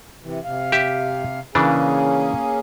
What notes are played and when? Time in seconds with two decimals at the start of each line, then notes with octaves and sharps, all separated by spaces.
0.23 C3 E3
0.44 C3 F5
0.72 G4 E5
1.55 C#3 E3 A#3 C#4 D4 G#4